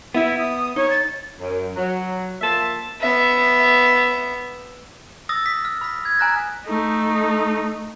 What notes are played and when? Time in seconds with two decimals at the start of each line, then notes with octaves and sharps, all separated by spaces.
0.14 B3 E4 E5
0.38 D#6
0.76 D#4 C#5
0.90 A6
1.39 F#2
1.76 F#3
2.41 F3 A#3 E5 A5 C6
3.01 B3 E5
5.29 D#6 E6 A6 A#6
5.46 B6
5.65 F6
5.81 B5 B6
6.05 G#6
6.19 G#5 A#5 F#6 A#6
6.65 A3 D#4